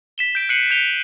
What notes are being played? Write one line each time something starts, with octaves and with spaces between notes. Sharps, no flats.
B6 E7 G7
G6 D7
F#6 C7 C#7 D#7 F#7 G7
G6 C#7 F7 G7